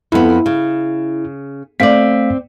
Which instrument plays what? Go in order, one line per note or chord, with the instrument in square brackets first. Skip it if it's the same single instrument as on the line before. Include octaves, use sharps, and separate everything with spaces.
[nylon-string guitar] F2 B3 [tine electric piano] E4
[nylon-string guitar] C#3
[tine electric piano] A3 F5 B6 [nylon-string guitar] C4 D5